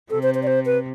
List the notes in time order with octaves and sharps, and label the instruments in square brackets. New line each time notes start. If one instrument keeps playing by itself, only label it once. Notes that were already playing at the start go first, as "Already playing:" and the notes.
[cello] C3 [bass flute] A4
[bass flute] C5
C5
D5
C5
B4